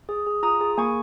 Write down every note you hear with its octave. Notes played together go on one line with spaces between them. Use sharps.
G#4
G#4
F4 A#5 D#6
G#4
A#3 G#5 C#6